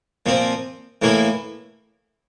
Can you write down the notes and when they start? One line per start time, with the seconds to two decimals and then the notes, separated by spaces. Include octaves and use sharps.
0.26 A#2 F3 C4
1.02 A2 E3 A#3 E4